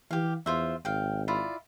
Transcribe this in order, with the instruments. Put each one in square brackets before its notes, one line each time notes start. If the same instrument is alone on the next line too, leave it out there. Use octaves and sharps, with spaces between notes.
[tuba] E3 [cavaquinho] G4 F5
[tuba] E2 [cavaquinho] F4 C5 E5
[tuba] G#1 [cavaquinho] F5 G5
[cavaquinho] E4 F4 D5